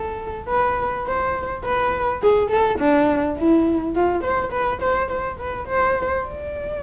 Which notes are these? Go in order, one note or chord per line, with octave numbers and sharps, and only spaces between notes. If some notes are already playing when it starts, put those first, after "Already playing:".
Already playing: A4
B4
C5
B4
G#4
A4
D4
E4
F4
C5
B4
C5
C5
B4
C5
D5